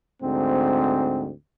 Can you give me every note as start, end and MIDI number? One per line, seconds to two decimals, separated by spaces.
0.23 1.31 38
0.23 1.31 44
0.23 1.31 60